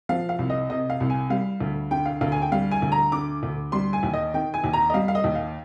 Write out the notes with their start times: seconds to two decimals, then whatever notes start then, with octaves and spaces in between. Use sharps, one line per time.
0.09 F3 F5
0.29 F5
0.39 C2
0.50 D#5
0.70 C3 D#5
0.90 F5
1.00 C2
1.10 G#5
1.30 G3 F5
1.61 D2
1.91 D3 G5
2.06 F5
2.21 D2 F5
2.32 G#5
2.42 G5
2.52 G3 F5
2.71 G#5
2.82 D2
2.92 A#5
3.12 D3 D6
3.43 D2
3.72 G3 C6
3.93 G#5
4.03 D#2
4.14 D#5
4.34 D#3 G5
4.54 G#5
4.64 D#2
4.73 A#5
4.90 D#5
4.94 G3 F5
5.08 F5
5.15 D#5
5.24 D#2
5.35 F5